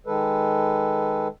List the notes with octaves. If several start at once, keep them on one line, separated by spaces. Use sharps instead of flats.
D#3 G#3 A4 B4